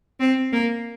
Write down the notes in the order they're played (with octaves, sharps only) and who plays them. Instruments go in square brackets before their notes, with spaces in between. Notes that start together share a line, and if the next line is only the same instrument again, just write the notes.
[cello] C4
A#3